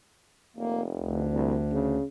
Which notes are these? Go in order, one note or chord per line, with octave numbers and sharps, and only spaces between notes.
F1 A#3
D2
C2
C#3